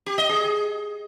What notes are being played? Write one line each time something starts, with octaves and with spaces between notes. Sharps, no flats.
G4
D#5
G#4